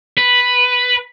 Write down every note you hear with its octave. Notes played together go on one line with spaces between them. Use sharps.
B4